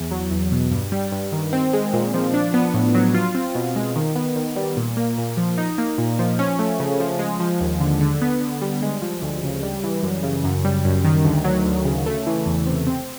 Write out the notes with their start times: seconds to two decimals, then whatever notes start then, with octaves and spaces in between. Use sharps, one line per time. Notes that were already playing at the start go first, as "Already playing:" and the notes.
Already playing: E2
0.11 F#3
0.31 E2
0.52 B2
0.71 G2
0.92 G3
1.12 G2
1.32 D#3
1.53 C4
1.73 G#3
1.93 A#2
2.14 F3
2.34 D4
2.54 B3
2.74 A2
2.94 F#3
3.14 F4
3.35 C4
3.55 B2
3.76 G#3
3.96 D#3
4.15 B3
4.36 D#3
4.56 G3
4.77 A#2
4.97 A#3
5.18 A#2
5.37 F3
5.58 D#4
5.78 A#3
5.98 A#2
6.19 F3
6.39 C#4
6.59 A3
6.80 C#3
7.00 F3
7.19 G#3
7.40 F3
7.61 D#2
7.80 D3
8.01 D3
8.21 B3
8.41 D3
8.61 G3
8.82 G#3
9.02 F3
9.22 D2
9.43 C#3
9.63 G3
9.83 E3
10.03 F#2
10.23 C#3
10.44 F#2
10.64 G3
10.85 F#2
11.04 D#3
11.24 D2
11.44 F#3
11.65 D2
11.85 C#3
12.06 A3
12.26 E3
12.46 E2
12.66 C3
12.87 C4